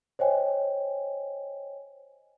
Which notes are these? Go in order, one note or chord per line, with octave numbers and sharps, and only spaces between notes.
C5 C#5 D#5 G5 G#5